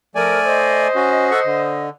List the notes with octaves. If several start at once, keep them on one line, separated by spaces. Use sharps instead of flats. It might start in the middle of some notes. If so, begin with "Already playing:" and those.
F3 A3 A#4 D5 G#5
C5 D#5
C#4 F#4
A4 F#5 C#6
D3